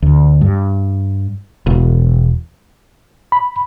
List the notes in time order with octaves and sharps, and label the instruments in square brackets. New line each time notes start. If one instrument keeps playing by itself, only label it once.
[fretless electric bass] D2
G2
E1
[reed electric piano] B5